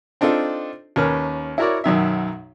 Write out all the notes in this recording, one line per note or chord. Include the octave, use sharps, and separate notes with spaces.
C4 D4 D#4 F4 A4
D#2 C#4 A#4 B4 F6
E4 F#4 A#4 C#5 D5
B1 F#2 D#3 E5